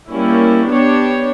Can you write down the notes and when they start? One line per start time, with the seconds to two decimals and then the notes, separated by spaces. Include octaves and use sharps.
0.08 G3 A#3 C#4 E4
0.67 B3 D4 G4 C#5